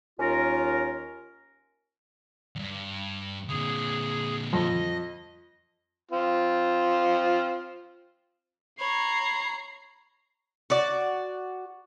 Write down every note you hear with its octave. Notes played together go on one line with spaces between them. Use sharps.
D#2 C#4 F4 A#4
E2 G2
A#2 D3 G#4
F2 D#5
C4 F4
C#5 A#5 B5 C7
F#4 D5